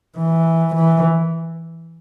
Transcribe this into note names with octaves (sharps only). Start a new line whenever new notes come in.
E3
E3